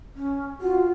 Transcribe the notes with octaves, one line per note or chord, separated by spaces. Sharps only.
C#4
F4 F#4